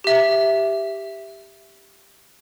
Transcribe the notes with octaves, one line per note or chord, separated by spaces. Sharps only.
G4 E5